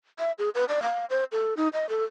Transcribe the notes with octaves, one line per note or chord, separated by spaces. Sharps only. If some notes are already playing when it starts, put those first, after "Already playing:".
E5
G#4
B4
D5
F5
C5
A4
D#4
D#5
A4